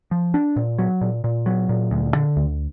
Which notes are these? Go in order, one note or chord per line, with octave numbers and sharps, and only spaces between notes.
F3
D4
A#2
F#3
A#2
A#2
F#3
A#2
D2
D3
D2